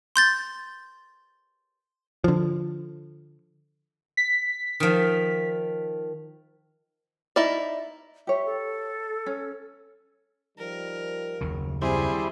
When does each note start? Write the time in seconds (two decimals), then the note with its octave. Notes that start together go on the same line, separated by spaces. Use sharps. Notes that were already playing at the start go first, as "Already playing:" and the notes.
0.16 C6 G6 A6
2.24 D3 F3
4.17 B6
4.80 D#3 F3
7.36 D#4 E4 D5
8.27 G4 C#5 E5
8.45 A4
9.26 C#4
10.58 D#3 F3 G3 A#4
11.41 F#1 D#2 C#3
11.82 G3 C4 E4 G#4 C5